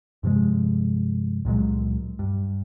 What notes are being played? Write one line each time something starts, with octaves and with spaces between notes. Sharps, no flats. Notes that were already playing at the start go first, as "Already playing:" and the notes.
G2 C3 F3 G#3
C#2 A#2 F#3 G#3
G2